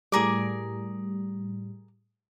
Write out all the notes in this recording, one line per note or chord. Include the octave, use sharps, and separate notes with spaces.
A2 G3 G#4 A#4 D6